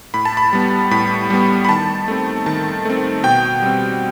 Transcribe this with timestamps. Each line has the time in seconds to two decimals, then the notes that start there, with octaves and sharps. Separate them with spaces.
0.14 A2 B5
0.25 A5
0.37 B5
0.53 G3 B3
0.91 A2 B5
1.30 G3 B3
1.65 B5
1.69 D#3 A5
2.08 A3 C4
2.46 D#3 A5
2.85 A3 C4
3.23 B2 G5
3.62 G3 C4